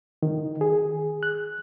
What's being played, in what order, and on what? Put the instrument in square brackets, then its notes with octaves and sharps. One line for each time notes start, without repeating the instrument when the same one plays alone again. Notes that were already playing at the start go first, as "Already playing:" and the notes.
[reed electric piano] D#3
G#4
F#6